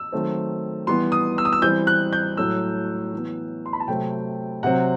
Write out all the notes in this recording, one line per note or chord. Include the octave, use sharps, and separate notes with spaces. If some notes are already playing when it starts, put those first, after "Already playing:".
Already playing: E6
D#3 F#3 A3 C4
E3 G3 B3 C6
D#6
E6
D#6
E6
E3 G3 C4 G6
F#6
G6
A2 F#3 A3 E6
E3 B3
C6
B5
A5
C3 F#3 A3 C4 G5
C3 F#3 C4 F#5